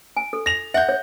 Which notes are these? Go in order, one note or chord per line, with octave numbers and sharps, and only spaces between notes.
G#5
A4
A#6 F7
E5 F#5 G6
C#5